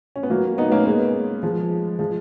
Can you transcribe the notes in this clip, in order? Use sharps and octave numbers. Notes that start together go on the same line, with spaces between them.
C#4
B3
F#3 A#3
B3 D#4
A#3 C#4
G#3 B3
F3 G#3
F3 G#3